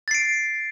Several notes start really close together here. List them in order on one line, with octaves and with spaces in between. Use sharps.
A6 C7 D7